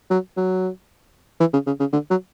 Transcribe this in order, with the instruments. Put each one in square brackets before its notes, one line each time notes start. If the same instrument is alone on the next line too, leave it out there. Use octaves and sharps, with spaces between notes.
[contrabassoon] F#3
F#3
E3
C#3
C#3
C#3
D3
F#3